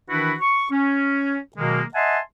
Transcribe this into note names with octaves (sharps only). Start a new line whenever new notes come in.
D#3 E3 D4 E4 F#4 B4
C#6
C#4
B2 D#3 F#3 G#3 A#3
D#5 E5 F#5 G#5 A5 C6